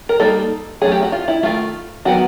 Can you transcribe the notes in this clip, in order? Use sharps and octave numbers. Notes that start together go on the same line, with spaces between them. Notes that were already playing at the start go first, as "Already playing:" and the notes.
A#4
G3 A#3 D#4 A4
F#3 A3 C#4 G#4
G4
F#4
F4
E4
D#3 F#3 A3 F4
D#3 F#3 B3 F#4